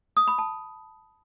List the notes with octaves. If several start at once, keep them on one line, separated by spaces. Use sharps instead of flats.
D#6
B5
A5